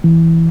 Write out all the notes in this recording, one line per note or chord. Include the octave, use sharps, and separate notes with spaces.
E3